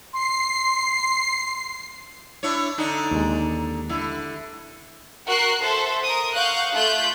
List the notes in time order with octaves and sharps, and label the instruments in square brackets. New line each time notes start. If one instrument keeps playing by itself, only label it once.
[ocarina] C6 [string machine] C7
[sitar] D4 E4 C#5
D3 D4 D#4
[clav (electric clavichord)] D#2 G#3
[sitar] D3 E4
[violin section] F#4 A#4 F#5 F#6 C7
A4 C5 E5
A#4 D#6
F5 F#5 C#6 F#6 G6
A3 F4 F#6 G6